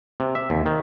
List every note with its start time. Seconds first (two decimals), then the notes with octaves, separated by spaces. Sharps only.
0.20 C3
0.35 E5
0.50 D#2
0.66 D#3